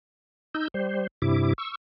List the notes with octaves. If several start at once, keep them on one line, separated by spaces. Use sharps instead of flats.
D#4 E6 G6
G3 C5
G2 C3 E4 D6
C#6 E6